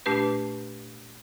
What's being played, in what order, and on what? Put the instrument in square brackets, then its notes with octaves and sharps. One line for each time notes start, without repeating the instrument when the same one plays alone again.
[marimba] A#2 A3 D4 G4 B4